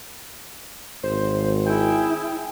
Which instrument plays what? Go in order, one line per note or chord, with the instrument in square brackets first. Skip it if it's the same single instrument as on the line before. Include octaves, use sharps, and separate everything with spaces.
[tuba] G#1 [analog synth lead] C5
[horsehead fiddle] E4 [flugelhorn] G#4 [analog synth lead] G5